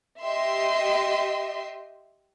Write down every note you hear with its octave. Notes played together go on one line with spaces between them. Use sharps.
G4 D#5 E5 C6